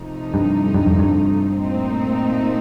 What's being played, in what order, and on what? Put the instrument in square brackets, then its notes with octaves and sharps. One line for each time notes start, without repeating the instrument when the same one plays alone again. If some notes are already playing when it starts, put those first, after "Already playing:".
Already playing: [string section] C3 F3 A3 D#4
[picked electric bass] G2
G2
F2
G2
[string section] A#2 A3 C4 D#4